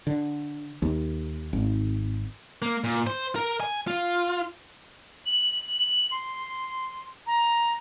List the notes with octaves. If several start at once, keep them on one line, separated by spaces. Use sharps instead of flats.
D3
D#2
G#1
A#3
A#2
C5
A#4
G#5
F4
F#7
C6
A#5